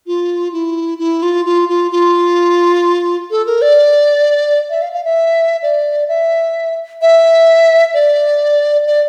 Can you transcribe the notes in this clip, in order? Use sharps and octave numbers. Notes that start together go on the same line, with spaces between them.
F4
E4
E4
F4
F4
F4
F4
A4
A#4
D5
E5
F5
F5
E5
D5
E5
E5
D5
D5